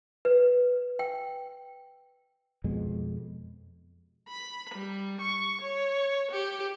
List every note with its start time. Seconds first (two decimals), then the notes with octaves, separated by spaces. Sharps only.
0.25 B4
0.99 G5
2.64 F2 B2 G#3
4.29 B5
4.74 G3
5.21 C#6
5.61 C#5
6.31 G4